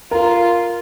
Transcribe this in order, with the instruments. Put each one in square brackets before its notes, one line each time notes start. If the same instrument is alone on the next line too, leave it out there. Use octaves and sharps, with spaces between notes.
[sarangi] F4 [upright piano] A#4